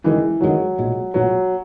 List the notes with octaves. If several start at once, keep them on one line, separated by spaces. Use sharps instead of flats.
F#1 F#2 D#3 E3 G#3
F#1 F#2 D#3 F#3 G#3
B1 A#2 G#3
B1 A#2 F#3 G#3